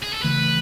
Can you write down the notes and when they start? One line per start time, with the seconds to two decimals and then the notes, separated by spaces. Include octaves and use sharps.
0.03 G#4
0.14 A4
0.24 C#3 E3 A3 B4